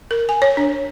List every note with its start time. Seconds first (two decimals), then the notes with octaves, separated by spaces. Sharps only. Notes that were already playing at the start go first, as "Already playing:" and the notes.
0.11 A#4
0.29 G#5
0.42 C#5
0.57 D4